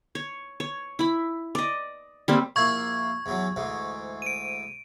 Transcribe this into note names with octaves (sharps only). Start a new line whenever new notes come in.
C#5
C#5
E4 B5
D5 D#5
G3 A#3 C4
A#1 A#3 E4 C#6 G#6
E2 E3 F#3
D2 G#2 E3
D7 D#7